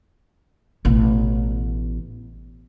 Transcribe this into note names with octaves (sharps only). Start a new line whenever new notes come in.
A1 B2